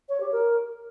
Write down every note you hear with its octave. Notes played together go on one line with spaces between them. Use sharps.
C#5
G4
A#4